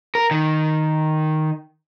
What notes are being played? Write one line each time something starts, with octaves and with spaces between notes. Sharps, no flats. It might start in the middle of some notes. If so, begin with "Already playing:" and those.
A#4
D#3